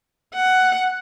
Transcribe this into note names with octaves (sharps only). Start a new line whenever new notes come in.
F#5